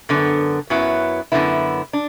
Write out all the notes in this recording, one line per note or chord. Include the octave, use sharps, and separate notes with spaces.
F#2 D3 B3
F#2 F#3 B3 E4
F#2 D3 B3 E4
D4